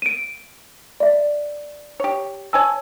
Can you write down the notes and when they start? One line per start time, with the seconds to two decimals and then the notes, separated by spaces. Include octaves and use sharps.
0.02 D7 D#7
1.00 D5 E5
2.00 G4 C#5
2.53 C#5 G#5 A5 E6